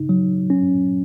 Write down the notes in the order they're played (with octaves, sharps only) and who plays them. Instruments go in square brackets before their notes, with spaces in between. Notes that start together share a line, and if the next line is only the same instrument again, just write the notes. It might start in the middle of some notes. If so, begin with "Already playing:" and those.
Already playing: [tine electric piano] C#3 D#4
F#3
C#4